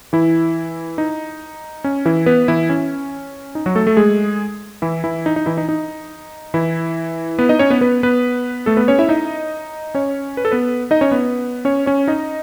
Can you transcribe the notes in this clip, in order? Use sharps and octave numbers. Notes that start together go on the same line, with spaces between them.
E3 E4
D#4
C#4
E3 E4
B3 B4
E3 E4
C#4
D#4
F#3 F#4
A3 A4
A3 A4
G#3 G#4
E3 E4
E3 E4
D#4
D#4
E3 E4
D#4
D#4
E3 E4
B3 B4
D#4 D#5
C#4 C#5
B3 B4
B3 B4
B3 B4
A3 A4
B3 B4
C#4 C#5
E4 E5
D#4 D#5
C#4 C#5
B4
A4
B3 B4
D#4 D#5
C#4 C#5
B3 B4
C#4 C#5
C#4 C#5
D#4 D#5